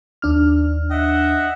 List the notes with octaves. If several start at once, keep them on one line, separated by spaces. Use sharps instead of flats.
D#2 D4 F6
D#5 E5 F#5